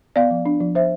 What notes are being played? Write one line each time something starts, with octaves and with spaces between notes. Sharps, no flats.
B3 D5 F5
F3
D4
F3
F3 C5 E5